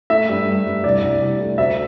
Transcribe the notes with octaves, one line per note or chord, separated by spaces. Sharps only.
A3 E5
G2
G2
G2
C2 D5
C2
C2
A3
D2 E5